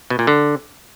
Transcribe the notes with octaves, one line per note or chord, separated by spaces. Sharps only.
B2
A#2
D3